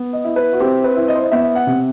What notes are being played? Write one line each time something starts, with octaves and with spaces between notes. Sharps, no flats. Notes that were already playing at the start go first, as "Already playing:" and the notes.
Already playing: B3
D#5
E4
B4
F#4
C4 G4
B4
E4
D#5
C5
D#5
B3 E5
F#5
C3